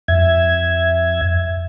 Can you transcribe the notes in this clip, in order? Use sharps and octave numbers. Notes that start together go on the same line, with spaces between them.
F2 E5 G#6